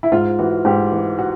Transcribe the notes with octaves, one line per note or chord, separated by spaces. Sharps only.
E4
G#2 F4
E3 F#4
G#2 G4
E3
F#4